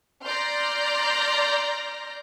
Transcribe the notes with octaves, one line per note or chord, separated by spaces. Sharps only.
D5 A#5 C6 F6 G6 A#6